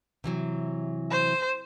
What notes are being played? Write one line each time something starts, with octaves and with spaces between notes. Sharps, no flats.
C3 E3 F#3
C5